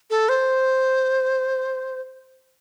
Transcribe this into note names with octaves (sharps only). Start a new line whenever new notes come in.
A4
C5